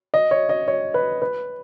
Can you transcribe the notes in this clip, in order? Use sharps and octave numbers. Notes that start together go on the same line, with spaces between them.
D#5
C#5
D#5
C#5
B4
B4